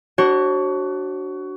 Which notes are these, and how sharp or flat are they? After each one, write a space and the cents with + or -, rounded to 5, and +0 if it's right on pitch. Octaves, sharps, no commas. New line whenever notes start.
D4 +0 F#4 +20 C#5 -45